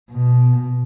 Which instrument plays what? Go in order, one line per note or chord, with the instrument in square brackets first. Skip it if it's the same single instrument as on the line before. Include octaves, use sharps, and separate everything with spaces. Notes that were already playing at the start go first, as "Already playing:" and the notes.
[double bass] B2